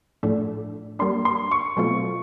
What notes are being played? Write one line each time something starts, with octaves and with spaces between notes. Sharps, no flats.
A2 F3 A3 D4
G3 A#3 D4 C6
C6
C#6
B2 F#3 A3 C4 F4